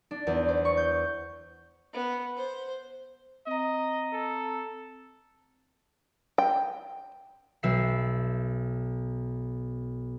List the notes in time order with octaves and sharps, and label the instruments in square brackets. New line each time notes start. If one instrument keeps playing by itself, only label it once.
[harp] D4
E2
C5
C#6
G6
[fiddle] B3
C5
[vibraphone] C4 A#5 [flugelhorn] D#5
[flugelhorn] A4
[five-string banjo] G5
[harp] B1 E5 C7